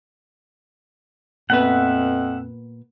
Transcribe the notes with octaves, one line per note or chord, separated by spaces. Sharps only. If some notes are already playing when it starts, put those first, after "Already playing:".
F2 A#2 B3 B4 E5 F#5